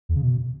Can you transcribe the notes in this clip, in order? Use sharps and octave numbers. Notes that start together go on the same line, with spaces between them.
E2
C#3
B2